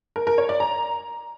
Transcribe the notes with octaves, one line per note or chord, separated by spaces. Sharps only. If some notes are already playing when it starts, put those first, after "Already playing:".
A#4
A#4
C#5
D5
A#5